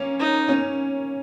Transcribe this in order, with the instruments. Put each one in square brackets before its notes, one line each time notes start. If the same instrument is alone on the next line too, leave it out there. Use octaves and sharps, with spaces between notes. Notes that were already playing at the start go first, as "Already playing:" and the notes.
Already playing: [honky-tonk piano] A#3 C#4
[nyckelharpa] D#4
[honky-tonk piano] A#3 C#4